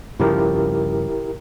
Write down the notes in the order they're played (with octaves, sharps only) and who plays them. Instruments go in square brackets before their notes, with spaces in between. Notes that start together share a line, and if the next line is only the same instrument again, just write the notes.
[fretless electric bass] G2 C#3 F3 [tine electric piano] E4 G4 A#4